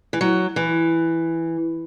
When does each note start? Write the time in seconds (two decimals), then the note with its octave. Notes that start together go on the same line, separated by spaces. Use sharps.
0.13 E3
0.21 F#3
0.56 E3